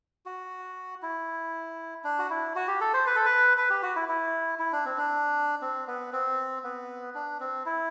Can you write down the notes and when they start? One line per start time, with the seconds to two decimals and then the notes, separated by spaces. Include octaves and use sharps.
0.26 F#4
1.02 E4
2.04 D4
2.19 F#4
2.30 E4
2.55 F#4
2.68 G4
2.81 A4
2.94 C5
3.07 B4
3.16 A4
3.25 B4
3.57 B4
3.70 G4
3.83 F#4
3.96 E4
4.09 E4
4.59 E4
4.72 D4
4.85 C4
4.98 D4
5.62 C4
5.87 B3
6.13 C4
6.64 B3
7.15 D4
7.40 C4
7.66 E4